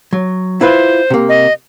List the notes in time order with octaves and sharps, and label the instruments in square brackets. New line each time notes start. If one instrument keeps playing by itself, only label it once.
[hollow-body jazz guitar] F#3
[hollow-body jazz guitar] E4 F4 B4 [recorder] C5
[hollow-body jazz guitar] C3 A#3
[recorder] D#5